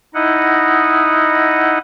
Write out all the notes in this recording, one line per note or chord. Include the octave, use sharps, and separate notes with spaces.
D#4 E4 D#5 F#5